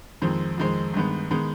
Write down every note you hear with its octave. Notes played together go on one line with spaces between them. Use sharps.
F2 D#3 G#3 C4
F2 D#3 G#3 C4
G2 D#3 G#3 B3
D#3 G#3 B3